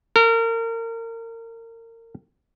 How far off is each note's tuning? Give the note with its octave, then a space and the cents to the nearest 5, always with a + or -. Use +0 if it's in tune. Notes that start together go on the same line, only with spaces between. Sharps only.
A#4 -30